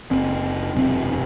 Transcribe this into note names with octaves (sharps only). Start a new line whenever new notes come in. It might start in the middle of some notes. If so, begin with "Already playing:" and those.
F#1 C4
E1 F#2 C3 C4